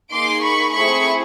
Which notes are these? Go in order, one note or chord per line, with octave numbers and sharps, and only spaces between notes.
A#3 D#4 G#4 C6 D6
B5 C#6
A3 C4 E4 G#4 B5 C#6